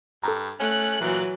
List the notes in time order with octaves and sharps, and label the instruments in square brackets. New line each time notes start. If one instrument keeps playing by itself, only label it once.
[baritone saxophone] G2 [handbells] A4 A#5
[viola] A3 [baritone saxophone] C#4 [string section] F#6
[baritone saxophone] A#2 [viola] E3 F#3